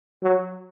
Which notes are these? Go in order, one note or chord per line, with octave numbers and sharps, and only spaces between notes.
F#3